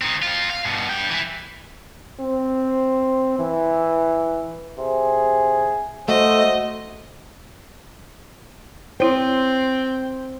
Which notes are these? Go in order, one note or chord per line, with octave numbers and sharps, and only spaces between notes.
D#3 C4
C4 F4
F5
G2 B2
G2 G5
E3 E4
C4
E3
C3 G#4
A3 F#4 C5 D#5
C4 E4 C5 C#5 G5